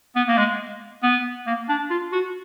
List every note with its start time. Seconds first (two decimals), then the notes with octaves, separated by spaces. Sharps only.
0.16 B3
0.29 A#3
0.38 G#3
1.03 B3
1.47 A#3
1.69 D4
1.90 F4
2.13 F#4